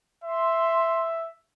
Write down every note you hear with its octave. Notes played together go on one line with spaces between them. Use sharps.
E5 C6